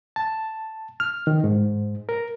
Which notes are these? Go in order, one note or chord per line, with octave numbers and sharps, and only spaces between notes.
A5
F6
D#3
G#2
A#4